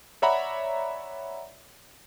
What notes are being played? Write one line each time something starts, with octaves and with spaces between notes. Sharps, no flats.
C#5 D5 E5 F#5 A#5 B5